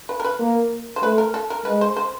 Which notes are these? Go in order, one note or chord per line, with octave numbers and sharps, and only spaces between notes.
B4
A#4
B4
A#3
C5
A3 B4
A#4
A4
A#4
G#3 B4
C5
C5